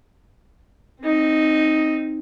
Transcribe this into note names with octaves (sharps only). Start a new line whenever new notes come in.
C4 D#4